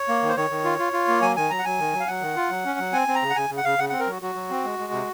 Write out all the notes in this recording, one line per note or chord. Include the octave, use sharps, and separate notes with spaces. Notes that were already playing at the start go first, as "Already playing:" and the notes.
Already playing: C#5
A#3
D#3
C5
D#3 C#5
D#3
F4
F4
F4
A#3
F#3 G#5
D#3 G#5
F#3 A#5
F#5
F#3 G#5
D#3
F#3
F5
F#3 F#5
D#3
F4
F#3
C#4
F#3
C4 G#5
C4
A#5
C#3
F#5
C#3 G#5
C#3
F#5
C#3 F5
C#3 F#5
C4 F#5
A#4
F#3 F#4
F#3 F#4
F#3
C4
G#3
G#3
C3